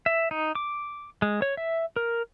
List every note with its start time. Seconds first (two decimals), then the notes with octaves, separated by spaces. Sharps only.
0.06 E5
0.31 D#4
0.55 D6
1.22 G#3
1.42 C#5
1.57 E5
1.96 A#4